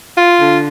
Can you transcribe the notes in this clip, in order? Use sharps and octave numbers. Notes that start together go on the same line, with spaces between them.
F4
D3